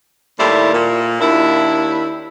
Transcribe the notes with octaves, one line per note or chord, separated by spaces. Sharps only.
D#2 A2 G3 E4 C5
A#2
D#2 D4 E4